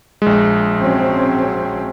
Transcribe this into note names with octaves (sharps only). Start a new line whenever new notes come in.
A#1 G#3
F#3 C4 C#4